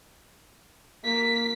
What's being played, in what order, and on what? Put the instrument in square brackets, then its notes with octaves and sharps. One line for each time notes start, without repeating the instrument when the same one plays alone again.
[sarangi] A#3 [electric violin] B6